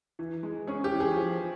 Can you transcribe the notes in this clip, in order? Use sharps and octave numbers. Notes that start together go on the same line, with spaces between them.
E3
G#3
C#4 G#4
G4
E3
G#4
F3